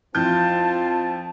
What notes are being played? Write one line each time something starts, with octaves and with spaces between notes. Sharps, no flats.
F2 E3 C4 F4 A5 G6